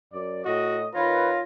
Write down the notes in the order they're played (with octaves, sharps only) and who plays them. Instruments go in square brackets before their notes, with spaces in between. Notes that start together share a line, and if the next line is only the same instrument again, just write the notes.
[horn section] F#2 D5
[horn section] A2 D#5 [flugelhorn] F#4
[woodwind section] D#3 C#5 A#5 [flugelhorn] F4 [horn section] B4